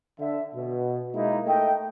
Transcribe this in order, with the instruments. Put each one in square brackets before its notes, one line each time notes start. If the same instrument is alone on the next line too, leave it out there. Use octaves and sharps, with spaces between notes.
[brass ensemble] D3 E5
B2
G#3 A#3 D#4 E4
A3 D#5 G5